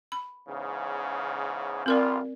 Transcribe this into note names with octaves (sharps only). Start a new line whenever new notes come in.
B5
E2 G#2 C#3
A1 G3 C4 F4 A#4 D5